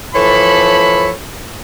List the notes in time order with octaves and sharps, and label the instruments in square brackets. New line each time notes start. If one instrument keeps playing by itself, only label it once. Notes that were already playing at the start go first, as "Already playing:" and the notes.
[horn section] E3 F3 A4 C#5 B5